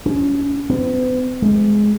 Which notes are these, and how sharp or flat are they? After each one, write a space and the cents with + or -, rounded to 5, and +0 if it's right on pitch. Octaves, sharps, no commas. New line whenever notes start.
C#4 +30
B3 +45
G#3 +10